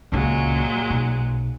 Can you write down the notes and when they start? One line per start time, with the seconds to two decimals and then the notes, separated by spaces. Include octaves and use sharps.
0.12 C#2 A#2 C#3 F#3 G#3
0.90 B1